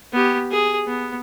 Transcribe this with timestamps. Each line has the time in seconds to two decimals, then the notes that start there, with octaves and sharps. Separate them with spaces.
0.13 B3 G4
0.51 G#4
0.87 B3